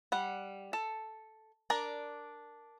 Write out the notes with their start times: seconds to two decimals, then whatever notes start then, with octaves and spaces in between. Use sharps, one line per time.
0.12 G3 F#5
0.73 A4
1.70 D4 A#4 D5